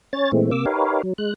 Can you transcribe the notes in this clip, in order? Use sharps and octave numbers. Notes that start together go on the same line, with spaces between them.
C#4 C#5 A6
A#2 E3 G#3 A3 C4
C3 A#3 D6 E6
D#4 G4 A#4 B4 C#5 F5
F#3
G#3 F#6